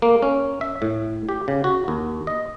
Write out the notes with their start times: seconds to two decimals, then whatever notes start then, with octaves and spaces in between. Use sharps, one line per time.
0.02 A#3
0.22 C#4
0.61 E5
0.82 A2
1.29 G4
1.48 C#3
1.64 F#4
1.88 D#2
2.27 D#5